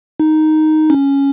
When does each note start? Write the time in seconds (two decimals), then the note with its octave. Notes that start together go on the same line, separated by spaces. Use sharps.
0.20 D#4
0.90 C#4